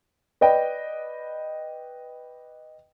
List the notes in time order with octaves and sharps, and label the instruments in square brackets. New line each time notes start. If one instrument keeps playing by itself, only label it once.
[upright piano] B4 D5 D#5 G5